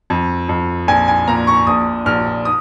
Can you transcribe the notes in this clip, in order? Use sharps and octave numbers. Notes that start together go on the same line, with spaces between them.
F2
F2
A#1 G#5
G#5
A#2 A#5
C#6
A#1 D#6
A#1 F6
D#6